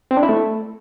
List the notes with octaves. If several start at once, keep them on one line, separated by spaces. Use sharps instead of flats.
C4
D4
E4
A3